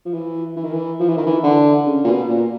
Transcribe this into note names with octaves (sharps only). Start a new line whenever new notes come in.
F3
E3
E3
D#3
E3
F3
E3
D#3
E3
D3
C#3
A#2
B2
A#2